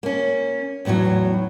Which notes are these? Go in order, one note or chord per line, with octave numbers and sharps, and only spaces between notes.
A#3 C#4
E2 A2 C#3 E3 F#3